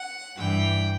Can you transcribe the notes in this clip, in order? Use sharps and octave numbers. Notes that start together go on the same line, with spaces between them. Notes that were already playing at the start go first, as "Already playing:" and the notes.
Already playing: F#5
G2 E3 G5